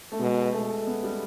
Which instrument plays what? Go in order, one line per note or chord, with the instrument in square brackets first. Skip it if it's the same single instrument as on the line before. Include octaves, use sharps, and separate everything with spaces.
[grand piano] A3
[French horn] B2 [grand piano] G#3
[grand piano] A3
B3
G3